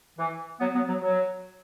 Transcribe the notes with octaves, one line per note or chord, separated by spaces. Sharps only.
E3
F#3 B3
F#3 B3
F#3
F#3